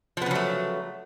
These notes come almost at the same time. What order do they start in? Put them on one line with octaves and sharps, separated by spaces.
F3 B3 C#3 F#3 A3